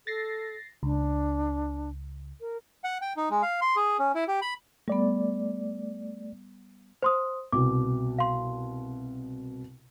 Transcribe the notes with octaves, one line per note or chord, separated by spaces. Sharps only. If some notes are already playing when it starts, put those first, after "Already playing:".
A4 A6 A#6 C7
C#2 D4
A#4
F#5
G5
D#4
G#3
F5
C6
G#4
C#4
E4
G4
B5
G3 A3 B3 D5
C5 C6 D#6
C2 B2 D6
F5 C6